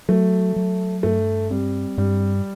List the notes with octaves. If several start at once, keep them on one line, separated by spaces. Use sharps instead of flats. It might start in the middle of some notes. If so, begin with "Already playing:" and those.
F#3 A3
F#3
G2 A3
G3 C4
G2 G3